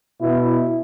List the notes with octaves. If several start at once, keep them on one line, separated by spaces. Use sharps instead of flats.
B2 E4